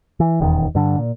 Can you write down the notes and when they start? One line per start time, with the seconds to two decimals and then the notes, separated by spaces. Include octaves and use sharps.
0.20 E3
0.40 D#1 E2 D#3
0.75 G2 D3
0.98 A#2